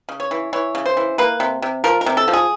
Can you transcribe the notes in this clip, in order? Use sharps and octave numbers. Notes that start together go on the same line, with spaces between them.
C#3
C#5
E3
E3 C#5
C#3
C5
E3
A#3 B4
C3
C3
F3 A#4
A#4
C3
A4
F3
G#4